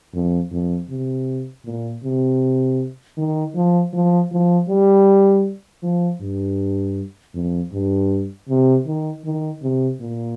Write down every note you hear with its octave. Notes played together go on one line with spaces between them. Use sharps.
F2
F2
C3
A#2
C3
D#3
F3
F3
F3
G3
F3
G2
F2
G2
C3
D#3
D#3
C3
A#2